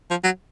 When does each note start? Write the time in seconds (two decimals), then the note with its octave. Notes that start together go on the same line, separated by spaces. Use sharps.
0.10 F3
0.24 F#3